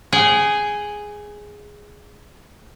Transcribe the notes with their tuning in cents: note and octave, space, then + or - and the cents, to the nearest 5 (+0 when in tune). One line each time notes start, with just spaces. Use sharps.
G#4 +0 G5 -45